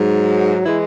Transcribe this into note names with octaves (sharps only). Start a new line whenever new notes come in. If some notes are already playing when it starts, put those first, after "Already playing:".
Already playing: G#2 F#3
E3 G#3 E4